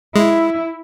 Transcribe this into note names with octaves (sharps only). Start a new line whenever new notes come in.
G#3 E4